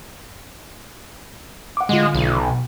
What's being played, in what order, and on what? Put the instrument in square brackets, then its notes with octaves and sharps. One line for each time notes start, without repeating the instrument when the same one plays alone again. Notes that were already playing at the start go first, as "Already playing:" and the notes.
[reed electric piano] F#5 D6
[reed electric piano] A2 D3 F4 [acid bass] G#3
[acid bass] B1
[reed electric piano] B2